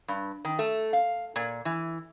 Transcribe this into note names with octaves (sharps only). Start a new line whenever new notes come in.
G2
D#3
A3
F5
A#2
E3